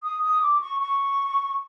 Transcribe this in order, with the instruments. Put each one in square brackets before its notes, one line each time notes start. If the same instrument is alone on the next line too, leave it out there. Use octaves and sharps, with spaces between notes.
[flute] D#6
D#6
D6
C#6
C#6